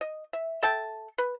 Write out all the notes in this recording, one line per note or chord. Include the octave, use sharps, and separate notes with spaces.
D#5
E5
A4 E5 G5 A5
B4